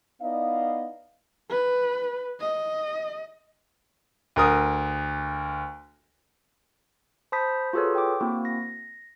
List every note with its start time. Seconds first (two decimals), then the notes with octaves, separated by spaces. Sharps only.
0.22 B3 D#4 E4 D5 D#5 F5
1.50 B4
2.40 D#5
4.36 D2 A#4 D#6
7.32 C5 A5 B5 D#6 G6 B6
7.73 F4 F#4 G#4 A4 B4 C#5
7.95 G5 D6
8.20 A#3 C4 E4 F#4
8.45 A#6